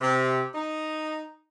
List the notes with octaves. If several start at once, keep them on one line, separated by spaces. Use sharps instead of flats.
C3
D#4